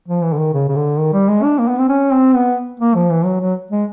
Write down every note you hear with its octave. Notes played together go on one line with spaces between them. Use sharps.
F3
E3
D3
D#3
C#3
C#3
D3
D#3
G3
G#3
D4
A#3
B3
C4
C#4
C4
B3
A#3
F3
E3
F#3
F#3
G#3